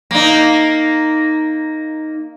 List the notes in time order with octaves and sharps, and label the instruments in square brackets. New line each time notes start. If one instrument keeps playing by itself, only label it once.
[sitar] A#3 D#4